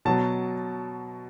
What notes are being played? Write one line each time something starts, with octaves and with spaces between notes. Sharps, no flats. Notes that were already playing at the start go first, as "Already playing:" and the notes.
B2 F#3 A5